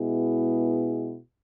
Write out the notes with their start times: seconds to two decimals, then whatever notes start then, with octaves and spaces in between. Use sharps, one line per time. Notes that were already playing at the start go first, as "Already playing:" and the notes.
Already playing: B2 G#3 B3 E4 G#4